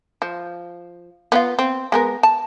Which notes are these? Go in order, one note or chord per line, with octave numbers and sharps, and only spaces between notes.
F3
B3 C4 F4
C4
G#3 B3 A#4
A5